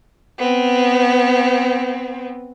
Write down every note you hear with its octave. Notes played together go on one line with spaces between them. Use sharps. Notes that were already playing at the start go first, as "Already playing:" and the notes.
B3 C4